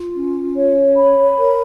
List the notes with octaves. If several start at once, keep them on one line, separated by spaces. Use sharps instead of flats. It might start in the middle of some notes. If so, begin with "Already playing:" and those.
Already playing: F4
C#4
C#5
B5
A#4